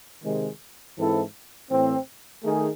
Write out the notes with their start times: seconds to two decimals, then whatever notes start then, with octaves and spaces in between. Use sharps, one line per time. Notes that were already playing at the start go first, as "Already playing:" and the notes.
0.22 C3 D#3 G#3
0.96 G#2 E3 C4 E4 A4
1.70 A2 E3 C4
2.44 D#3 A3 D#4 G#4